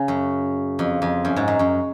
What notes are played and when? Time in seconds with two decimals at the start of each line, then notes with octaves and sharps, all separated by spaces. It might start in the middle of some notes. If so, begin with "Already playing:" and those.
Already playing: C#3
0.08 F#2
0.79 F2
1.02 F2
1.25 F#2
1.36 G#2
1.48 F#2
1.59 F#2